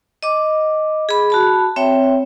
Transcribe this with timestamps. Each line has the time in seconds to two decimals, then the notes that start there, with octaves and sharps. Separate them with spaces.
0.23 D#5 D6
1.09 G#4 B5
1.30 F#4 A5 B5
1.76 C4 C#5 E5 G5